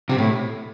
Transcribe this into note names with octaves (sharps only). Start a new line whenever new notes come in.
C3
A2